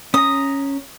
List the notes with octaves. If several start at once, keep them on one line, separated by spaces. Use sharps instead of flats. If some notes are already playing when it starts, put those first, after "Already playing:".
C#4 A#5 D#6